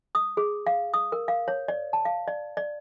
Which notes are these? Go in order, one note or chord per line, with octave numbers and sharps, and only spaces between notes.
D#6
G#4
F5
D#6
A#4
F5
C#5
D5
A5
F5
D5
D5